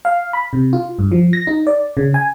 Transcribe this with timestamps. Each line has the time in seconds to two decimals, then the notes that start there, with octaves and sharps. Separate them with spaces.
0.05 F5
0.33 B5
0.53 C3
0.73 F4
0.99 G2
1.12 F3
1.33 A#6
1.47 D#4
1.67 D5
1.97 C#3
2.14 G#5